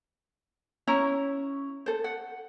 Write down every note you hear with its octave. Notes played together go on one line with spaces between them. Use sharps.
C#4 E4 A#5
A4 C5
F#5